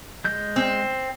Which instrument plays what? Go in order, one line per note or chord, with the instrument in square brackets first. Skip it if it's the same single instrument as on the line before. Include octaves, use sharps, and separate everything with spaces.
[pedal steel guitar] G#3 G6
[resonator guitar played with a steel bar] C4